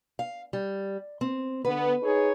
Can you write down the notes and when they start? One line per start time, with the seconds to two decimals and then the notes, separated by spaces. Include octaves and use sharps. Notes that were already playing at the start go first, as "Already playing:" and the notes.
0.19 F5
0.53 G3
1.21 C4
1.65 D3 B3 B4
2.03 D#4 G#4 C#5